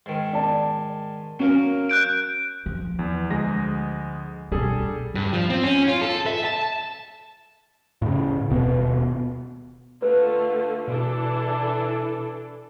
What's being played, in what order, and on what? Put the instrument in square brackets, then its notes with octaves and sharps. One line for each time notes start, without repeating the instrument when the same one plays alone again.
[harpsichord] G#2 D#3
[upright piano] D5 A5
[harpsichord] F#3 A#3 A#4 [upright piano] C#4
[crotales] F#6 G6 D7
[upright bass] F3
[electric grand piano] E2
D2 G#3 A#6
[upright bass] B1 D4 [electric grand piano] G3 G#4 A4
[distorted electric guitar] G2
F3
C4
C#4
F4
A4
E5
A5
[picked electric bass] A2 C#3
D#1 B2 B3
[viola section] D3 A3 F4 [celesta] B4
[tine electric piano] B2 [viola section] E3 D4 A4